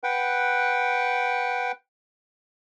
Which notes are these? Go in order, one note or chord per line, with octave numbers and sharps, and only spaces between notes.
B4 F#5 G5